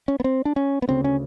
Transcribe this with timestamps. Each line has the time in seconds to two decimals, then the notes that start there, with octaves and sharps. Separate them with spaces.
0.08 C#4
0.20 B3
0.24 C4
0.45 D4
0.56 C#4
0.82 B3
0.88 D2 C#3 C4
1.04 C#4